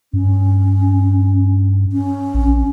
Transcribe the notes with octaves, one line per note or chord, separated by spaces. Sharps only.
G2 C#4
C#4
A#1